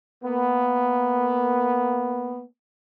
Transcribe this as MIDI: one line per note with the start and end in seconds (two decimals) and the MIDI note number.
0.23 2.43 58
0.23 2.43 59